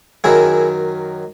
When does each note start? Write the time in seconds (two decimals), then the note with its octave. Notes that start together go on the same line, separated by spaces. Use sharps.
0.24 F#2 D#3 F#3 E4 G#4